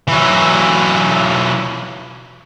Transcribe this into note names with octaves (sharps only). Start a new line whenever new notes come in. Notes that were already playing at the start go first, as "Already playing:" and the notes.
E3 F#3